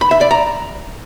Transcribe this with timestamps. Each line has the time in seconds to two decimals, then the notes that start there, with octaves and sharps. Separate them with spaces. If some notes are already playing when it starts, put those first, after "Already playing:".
0.01 B5
0.11 E5
0.21 D5
0.31 A#5